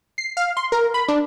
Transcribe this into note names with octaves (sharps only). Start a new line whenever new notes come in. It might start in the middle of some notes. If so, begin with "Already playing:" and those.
C7
F5
C6
A#4
B5
D4